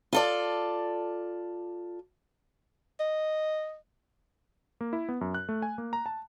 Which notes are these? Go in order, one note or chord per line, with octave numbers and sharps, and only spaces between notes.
F4 A4 D5
D#5
A#3
E4
B3
F#2
F#6
A3
G#5
A#3
A#5
A5